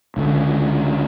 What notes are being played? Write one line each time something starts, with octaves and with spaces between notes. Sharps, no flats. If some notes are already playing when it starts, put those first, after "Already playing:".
C#2 D3